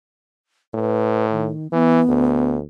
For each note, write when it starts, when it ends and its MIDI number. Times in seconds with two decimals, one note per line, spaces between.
0.74 1.52 45
0.74 1.25 71
1.31 1.67 51
1.72 2.01 52
1.72 2.56 59
2.08 2.63 38